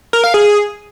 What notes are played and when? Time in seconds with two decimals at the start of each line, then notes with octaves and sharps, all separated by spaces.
0.13 A#4
0.24 F5
0.34 G#4